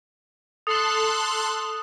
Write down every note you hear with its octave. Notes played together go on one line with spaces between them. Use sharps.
A4 C6 D#6 F#6